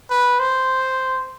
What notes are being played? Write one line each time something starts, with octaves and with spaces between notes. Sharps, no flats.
B4
C5